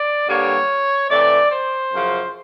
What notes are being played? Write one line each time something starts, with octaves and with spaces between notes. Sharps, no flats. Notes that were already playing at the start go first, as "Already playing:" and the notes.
Already playing: D5
G2 D3 G3 A#3 C#5
C3 E3 A3 D5
C5
F#2 C#3 F3